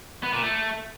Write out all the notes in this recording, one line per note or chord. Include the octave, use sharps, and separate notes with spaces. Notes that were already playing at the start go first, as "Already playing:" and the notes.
B3
A#2
A3